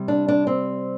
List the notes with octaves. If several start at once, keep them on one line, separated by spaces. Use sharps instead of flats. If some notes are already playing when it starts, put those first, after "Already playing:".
Already playing: C3 G3
D4
D4
C4